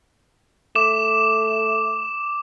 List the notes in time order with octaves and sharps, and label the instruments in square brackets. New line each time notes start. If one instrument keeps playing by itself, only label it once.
[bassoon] A3 [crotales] D6 E7